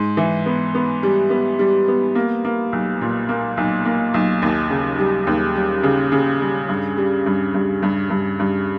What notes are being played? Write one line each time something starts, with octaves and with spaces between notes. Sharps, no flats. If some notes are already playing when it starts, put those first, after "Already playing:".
Already playing: G#2
E3
B3
B3
G3
B3
G3
B3
A#3
A#3
B1
A#2
A#3
B1
A#3
B1
D#2
C#3
G3
D#2
G3
C#3
C#3
G3
G2
G3
G2
G2
G2
G2
G2